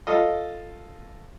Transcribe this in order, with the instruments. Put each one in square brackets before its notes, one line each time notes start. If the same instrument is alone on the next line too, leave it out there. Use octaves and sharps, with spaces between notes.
[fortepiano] F4 A4 D#5